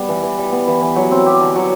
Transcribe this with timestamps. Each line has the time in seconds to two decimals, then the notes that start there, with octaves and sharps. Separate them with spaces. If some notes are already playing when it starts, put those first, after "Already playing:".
Already playing: G3 B3
0.08 E3
0.23 E3
0.38 G3
0.52 B3
0.67 E3
0.81 E3
0.96 F#3
1.11 C4
1.26 G4
1.40 D3
1.55 F#3